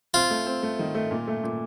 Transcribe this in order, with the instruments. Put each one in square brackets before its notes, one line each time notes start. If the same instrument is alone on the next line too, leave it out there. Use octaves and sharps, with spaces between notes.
[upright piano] C4 [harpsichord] F4
[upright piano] A3
C4
A3
D#3
A3
A#2
A3
A#2